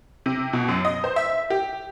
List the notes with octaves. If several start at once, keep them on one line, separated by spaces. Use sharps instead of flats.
C3
B2
F#2
D#5
C5
E5
G4